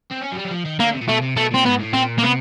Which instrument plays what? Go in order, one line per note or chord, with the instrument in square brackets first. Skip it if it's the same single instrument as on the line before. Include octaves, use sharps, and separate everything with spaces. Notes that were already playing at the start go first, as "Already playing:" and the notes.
[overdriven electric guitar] C4
C#4
F#3
G3
F#3
F3
D#3
[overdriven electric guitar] D3 [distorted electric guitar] A#3
[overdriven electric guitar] C3
A#2
[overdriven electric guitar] B2 [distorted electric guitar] A3
[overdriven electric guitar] C3
[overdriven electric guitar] B2 [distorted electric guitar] A3
[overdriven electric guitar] A#2 [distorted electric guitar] C4
[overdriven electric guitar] G#2 [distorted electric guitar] B3
[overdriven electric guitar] A2
[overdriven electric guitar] A#2 [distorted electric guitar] C4
[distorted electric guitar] A#3
[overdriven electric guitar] C3 [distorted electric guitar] B3